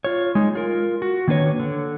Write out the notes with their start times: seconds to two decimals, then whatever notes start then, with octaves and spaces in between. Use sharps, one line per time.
0.04 F4 C#5
0.35 G#3 D#4
0.55 F4 A#4
1.02 F#4
1.28 D#3 A#3 D4 B4 C#5
1.60 D3